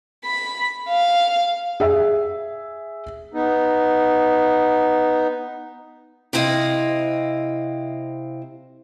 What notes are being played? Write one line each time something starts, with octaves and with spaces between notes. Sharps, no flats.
B5
F5
G#4 E5
B3 D#4
C3 C4 E4 D#5 F5